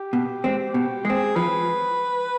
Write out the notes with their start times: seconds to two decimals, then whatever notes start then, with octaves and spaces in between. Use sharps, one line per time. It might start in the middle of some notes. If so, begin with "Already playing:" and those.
Already playing: G4
0.13 B2
0.44 G#3 C4
0.74 B2 G4
1.05 G#3 C4 G#4
1.36 F3 B4